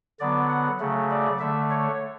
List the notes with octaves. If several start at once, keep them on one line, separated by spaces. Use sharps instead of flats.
D3 F#3 B3 D5
F#5
C#3 F#3 A3
D5
D3 A3 E5
C#5